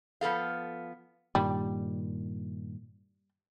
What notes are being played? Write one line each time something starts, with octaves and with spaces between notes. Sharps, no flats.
F3 B3 A4 F5
G2 A#2 D#3 G3